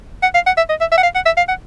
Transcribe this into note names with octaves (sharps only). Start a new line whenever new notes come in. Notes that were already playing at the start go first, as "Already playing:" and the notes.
F#5
F5
F#5
E5
D#5
E5
E5
F#5
F5
F#5
E5
F5
F#5